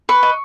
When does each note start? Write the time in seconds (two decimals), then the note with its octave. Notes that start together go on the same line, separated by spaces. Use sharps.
0.09 B4 C#6
0.23 D#5